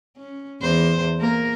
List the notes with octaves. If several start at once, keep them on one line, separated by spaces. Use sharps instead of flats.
C#4
E2 C5
A#3 A#4